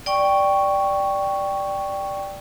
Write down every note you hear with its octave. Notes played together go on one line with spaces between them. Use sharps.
D5 G5 C#6